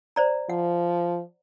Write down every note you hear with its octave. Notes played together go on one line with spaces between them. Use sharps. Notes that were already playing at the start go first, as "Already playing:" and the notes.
C5 D5 A#5
F3 F#5